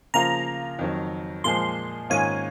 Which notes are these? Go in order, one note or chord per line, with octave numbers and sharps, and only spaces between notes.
C#3 F3 A#3 F4 A#5
F2 D#3 F#3
A#2 F3 G#3 C6
G#2 D#3 A#3 C#4 F4 G#5